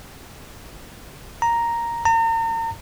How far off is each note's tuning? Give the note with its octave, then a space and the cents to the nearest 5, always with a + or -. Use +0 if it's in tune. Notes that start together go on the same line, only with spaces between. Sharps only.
A#5 +0
A#5 -40